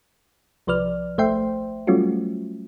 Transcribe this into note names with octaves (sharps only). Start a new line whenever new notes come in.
C2 F3 B4 D5 F6
G#1 A3 C5 E5 G5 C6
F#3 G3 A3 C#4 F4 F#4